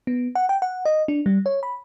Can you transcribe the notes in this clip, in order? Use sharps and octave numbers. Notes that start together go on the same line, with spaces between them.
B3
F#5
G5
F#5
D#5
D4
G3
C#5
B5